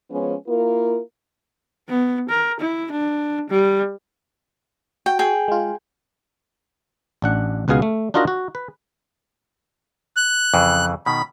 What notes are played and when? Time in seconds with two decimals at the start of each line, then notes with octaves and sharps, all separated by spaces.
0.11 F3 G#3 B3 C#4
0.48 A#3 E4 F4 A#4
1.89 B3
2.29 A#4
2.60 E4
2.91 D4
3.50 G3
5.06 F#4 G5
5.19 G#4 G5
5.48 G#3 F4
7.22 A1 D4 F#5
7.68 C#2 B2 B3 G#4 F5 G#5
7.82 A3
8.14 D4 D#4 F4 F#4 A#4 D#5
8.28 F#4
8.55 B4
10.17 F#6
10.54 F2 C#3 E3
11.06 B2 D#3 B5